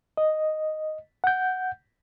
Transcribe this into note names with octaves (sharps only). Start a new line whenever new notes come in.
D#5
F#5 G6